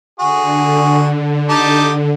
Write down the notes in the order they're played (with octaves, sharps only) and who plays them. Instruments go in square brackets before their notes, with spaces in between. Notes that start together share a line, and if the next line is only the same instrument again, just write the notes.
[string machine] D3 [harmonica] F#4 G#4
[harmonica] D#4 G4 A5